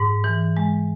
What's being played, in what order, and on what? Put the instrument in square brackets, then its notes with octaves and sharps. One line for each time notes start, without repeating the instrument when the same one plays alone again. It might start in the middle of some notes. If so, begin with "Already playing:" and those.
Already playing: [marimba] G#2
E3
G#3